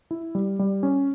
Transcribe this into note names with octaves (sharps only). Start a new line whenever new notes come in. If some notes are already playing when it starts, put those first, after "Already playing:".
E4
G3
G3
C#4